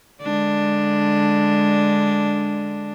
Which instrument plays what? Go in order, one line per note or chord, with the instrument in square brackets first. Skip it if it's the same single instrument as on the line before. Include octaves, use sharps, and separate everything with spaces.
[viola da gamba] D3 G#3 D4